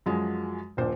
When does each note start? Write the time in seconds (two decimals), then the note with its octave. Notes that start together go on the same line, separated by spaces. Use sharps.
0.06 F#2 F3 F#3 G#3
0.77 D#1 A#1 A#2 C5